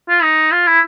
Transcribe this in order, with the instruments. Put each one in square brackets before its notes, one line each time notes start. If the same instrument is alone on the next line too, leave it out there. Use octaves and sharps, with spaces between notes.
[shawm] F4
D#4
F4
E4